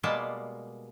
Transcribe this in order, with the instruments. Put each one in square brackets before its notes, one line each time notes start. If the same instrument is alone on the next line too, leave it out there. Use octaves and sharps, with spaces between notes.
[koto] B2 G3 G#3 A#3 D5 A5